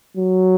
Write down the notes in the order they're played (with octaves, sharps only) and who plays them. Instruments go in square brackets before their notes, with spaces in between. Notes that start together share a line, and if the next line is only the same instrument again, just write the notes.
[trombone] F#3